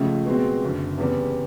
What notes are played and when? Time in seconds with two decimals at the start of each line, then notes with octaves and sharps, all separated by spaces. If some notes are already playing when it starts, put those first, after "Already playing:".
Already playing: C#2 C#3 F3 A3
0.25 B2 G#3 C4
0.62 F#1 F#2 D3
0.98 E2 C#3 E3 G3 C4